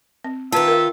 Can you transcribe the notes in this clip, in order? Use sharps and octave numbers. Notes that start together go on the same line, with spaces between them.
C4
D#3 F4 B4 E5 A5
A#4 F5